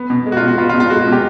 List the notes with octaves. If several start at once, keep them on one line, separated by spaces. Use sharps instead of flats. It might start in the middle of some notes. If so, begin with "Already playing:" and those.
Already playing: B3
B2
G#3
F#4
F4
B2
F#4
B3 F4
F4
B2
F4
G#3 F#4
F#4
B2
G4